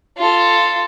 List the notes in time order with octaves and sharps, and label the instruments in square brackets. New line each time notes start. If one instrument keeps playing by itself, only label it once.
[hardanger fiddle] F4 A4